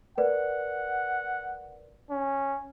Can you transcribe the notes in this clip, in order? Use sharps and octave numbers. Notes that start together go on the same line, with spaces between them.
A#4 B4 D5 F#5
C#4